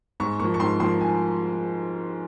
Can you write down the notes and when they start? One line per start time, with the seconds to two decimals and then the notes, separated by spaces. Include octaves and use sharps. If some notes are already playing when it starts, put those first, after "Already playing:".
0.20 G#2 C#6
0.39 F3 A#3 C#6
0.54 C#6
0.60 G#2 C6
0.80 F3 A#3 C6
1.01 G#5